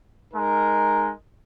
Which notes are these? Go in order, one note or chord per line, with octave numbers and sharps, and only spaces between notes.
G#3 D#4 A#4